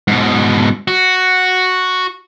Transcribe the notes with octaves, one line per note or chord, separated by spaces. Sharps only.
G#2 B2
F#4